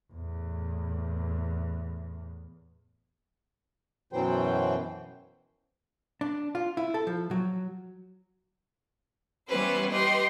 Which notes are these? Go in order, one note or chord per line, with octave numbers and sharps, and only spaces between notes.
E2 A2
F#2 B2 E3 F#3 C5 G5
D4
F4
E4
A4
F3
F#3
E3 G3 B3 C#4 B4 C5
G4 B4 D#5 C6